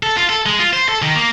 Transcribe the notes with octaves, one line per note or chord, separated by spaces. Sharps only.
A4
F4
A4
G#3
F4
C5
A4
D#3
A#3